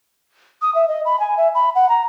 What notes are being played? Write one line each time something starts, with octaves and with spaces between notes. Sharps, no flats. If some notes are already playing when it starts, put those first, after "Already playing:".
D#6
E5
D#5
B5
G#5
E5
B5
F#5
A#5